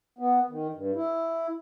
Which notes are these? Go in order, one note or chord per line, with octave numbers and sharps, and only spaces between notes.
B3
D#3
G2
E4